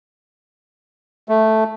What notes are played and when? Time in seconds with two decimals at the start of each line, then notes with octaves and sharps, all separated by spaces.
1.29 A3